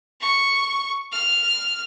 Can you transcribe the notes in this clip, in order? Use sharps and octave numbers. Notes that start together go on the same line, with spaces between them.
C#6
F6